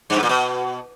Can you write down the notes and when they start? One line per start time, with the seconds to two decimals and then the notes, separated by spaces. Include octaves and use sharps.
0.10 G2
0.16 G#2
0.23 A#2
0.29 B2